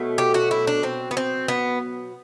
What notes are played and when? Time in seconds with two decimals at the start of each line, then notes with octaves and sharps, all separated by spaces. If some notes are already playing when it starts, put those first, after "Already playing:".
Already playing: B2 F#3 A3
0.18 G4
0.34 F#4
0.51 E4
0.67 D4
0.83 C4
1.11 B3
1.17 C4
1.48 B3